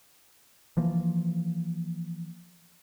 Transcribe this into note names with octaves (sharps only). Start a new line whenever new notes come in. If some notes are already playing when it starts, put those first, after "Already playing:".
E3 F3 A#3